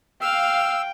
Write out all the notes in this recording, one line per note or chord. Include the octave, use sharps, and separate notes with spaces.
F5 G5 E6